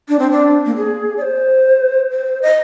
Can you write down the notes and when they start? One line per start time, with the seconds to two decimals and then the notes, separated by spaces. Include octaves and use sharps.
0.09 D4
0.19 C4
0.31 D4
0.66 A#3
0.77 G#4
1.17 D5
1.22 C5
2.11 C5
2.42 D#5